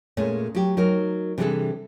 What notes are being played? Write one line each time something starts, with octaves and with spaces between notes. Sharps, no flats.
A#2 G#3 A3 C#4
F#3 G4
F#3 D#4 A#4
C3 E3 G3 D4 G#4 A4